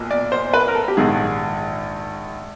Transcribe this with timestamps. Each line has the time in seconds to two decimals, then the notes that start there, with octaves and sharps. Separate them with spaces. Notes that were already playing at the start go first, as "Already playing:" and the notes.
Already playing: B1 A#2
0.11 D5
0.32 C5
0.54 B4
0.68 A#4
0.75 A4
0.88 G4
0.97 A#1 G#2 D#3 G#4